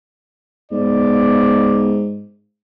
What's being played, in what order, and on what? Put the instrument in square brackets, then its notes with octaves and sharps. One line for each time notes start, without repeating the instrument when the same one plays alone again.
[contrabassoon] G#2 [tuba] B3 [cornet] D5